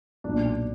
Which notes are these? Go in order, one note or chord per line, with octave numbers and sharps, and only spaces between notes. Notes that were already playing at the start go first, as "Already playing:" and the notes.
B1 A#2 D4